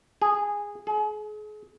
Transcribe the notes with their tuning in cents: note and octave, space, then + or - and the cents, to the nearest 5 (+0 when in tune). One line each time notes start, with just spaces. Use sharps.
G#4 -15
G#4 +35